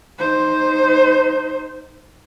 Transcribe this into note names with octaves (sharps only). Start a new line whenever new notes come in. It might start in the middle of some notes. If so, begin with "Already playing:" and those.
D#4 C5